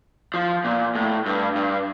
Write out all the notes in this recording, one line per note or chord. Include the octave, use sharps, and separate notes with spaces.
F3
A#2
A2
G2
G2